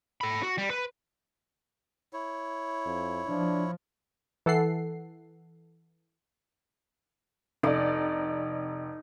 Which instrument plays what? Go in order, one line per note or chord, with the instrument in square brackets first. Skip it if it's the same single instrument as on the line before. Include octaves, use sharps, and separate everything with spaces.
[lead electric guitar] A4 B5
F#4
G3
B4
[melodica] E4 C#5
[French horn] F2
[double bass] F3 [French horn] D4
[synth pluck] E3 A4 F#5 C7
[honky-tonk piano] F1 D5 [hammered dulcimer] D#4